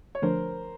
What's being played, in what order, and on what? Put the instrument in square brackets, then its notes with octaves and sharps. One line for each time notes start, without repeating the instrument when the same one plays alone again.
[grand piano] C#5
[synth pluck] D3 F3 A3 D4 [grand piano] A#4 C5